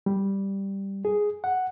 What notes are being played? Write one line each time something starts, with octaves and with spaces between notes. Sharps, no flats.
G3
G#4
F#5